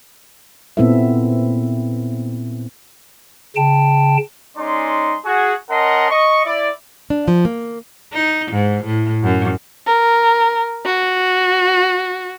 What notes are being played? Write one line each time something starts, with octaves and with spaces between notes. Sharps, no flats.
A#2 B3 C4 E4 A4 E5
C#3 G5 A5
G#3 C#4 D#4 D5 C6
F#4 G#4
C#4 A#4 D#5 F#5 A5 C6
D#5 C#6
E4 D5
D4
F3
A#3
D#4
G#2
A2
F#2
A#4
F#4